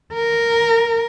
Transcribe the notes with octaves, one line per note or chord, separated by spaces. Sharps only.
A#4